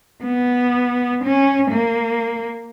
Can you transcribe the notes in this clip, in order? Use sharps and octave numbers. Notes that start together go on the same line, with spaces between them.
B3
C#4
A#3